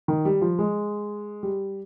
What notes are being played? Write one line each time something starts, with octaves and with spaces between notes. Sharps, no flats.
D#3
G3
F3
G#3
G3